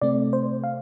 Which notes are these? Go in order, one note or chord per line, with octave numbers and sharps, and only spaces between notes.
C3 A3 C4 D5
C5
F5